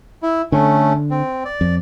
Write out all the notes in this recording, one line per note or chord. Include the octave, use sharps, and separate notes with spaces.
E4
D3 A3 C#4
C4
D5
F2